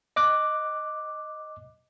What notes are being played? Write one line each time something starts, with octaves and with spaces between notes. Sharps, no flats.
D#5 D6 F#6